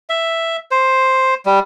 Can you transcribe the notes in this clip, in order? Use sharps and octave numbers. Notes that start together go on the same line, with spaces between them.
E5
C5
G3